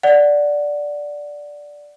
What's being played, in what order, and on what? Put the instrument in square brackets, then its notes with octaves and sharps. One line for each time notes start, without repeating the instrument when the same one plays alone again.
[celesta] D5 F#5